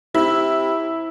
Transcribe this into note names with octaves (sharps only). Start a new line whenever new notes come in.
C3 E4